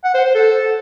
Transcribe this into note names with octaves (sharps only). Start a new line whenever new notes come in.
F#5
C5
C5
A4